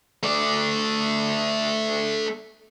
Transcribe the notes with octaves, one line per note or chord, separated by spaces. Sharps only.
A3 D5